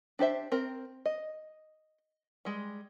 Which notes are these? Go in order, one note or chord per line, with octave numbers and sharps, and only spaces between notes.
D4 G4 C5 E5
C4 A#4
D#5
G3 G#3